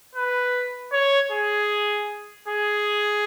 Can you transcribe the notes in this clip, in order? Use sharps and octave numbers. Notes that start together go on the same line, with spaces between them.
B4
C#5
G#4
G#4